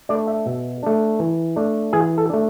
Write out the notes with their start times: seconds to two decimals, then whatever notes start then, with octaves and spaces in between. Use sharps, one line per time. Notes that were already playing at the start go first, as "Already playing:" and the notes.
0.09 A3 D4 D5
0.27 E5
0.46 B2
0.83 A3 D4
1.19 E3
1.56 A3 D4
1.93 E3 G#4
2.18 A4
2.30 A3 D4